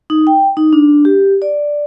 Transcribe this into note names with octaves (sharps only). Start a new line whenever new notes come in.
D#4
G5
D#4
D4
G4
D5